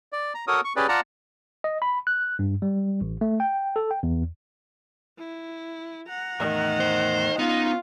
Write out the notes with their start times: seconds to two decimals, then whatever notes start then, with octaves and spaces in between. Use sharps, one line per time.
0.12 D5
0.34 A#5
0.47 F#4 A4 A#4 C#5 D#6
0.64 C#6
0.76 C#4 G4 G#4 B4 D5
0.89 F4 D5 F#5 A5 A#5
1.64 D#5
1.82 B5
2.07 F#6
2.39 G2
2.62 G3
3.01 A1
3.21 A3
3.40 G5
3.76 A4
3.91 G5
4.03 E2
5.18 E4
6.09 F#5 A#5
6.40 E2 A2 D#3 A#4
6.80 C5
7.39 B3 C#4 D#4 F4